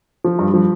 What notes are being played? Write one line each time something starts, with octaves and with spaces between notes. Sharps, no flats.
F3
G2
F3